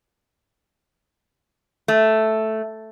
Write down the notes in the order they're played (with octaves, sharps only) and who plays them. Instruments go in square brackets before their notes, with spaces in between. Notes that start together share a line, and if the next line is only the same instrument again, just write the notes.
[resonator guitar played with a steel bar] A3